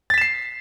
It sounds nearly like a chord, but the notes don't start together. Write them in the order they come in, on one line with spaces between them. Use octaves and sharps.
A6 B6 E7 C7